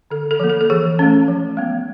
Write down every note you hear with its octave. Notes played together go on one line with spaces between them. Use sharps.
D3 A4
A4
F3 A#3
A4
A4
E3 G#4
A3 C#4
F3
G#3 B3